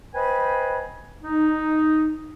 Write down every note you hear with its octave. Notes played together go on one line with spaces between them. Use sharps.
B4 C5 D#5 G5 G#5 B5
D#4